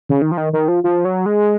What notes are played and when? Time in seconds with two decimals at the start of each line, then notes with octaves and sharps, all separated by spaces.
0.09 C#3
0.22 D#3
0.32 F3
0.37 D#3
0.53 D#3
0.68 F3
0.84 F3
1.05 F#3
1.26 G#3